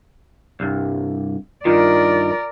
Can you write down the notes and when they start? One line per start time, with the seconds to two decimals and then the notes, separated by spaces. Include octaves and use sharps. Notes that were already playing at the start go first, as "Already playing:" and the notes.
0.60 C2 G2
1.65 G2 D#3 F4 A#4 D5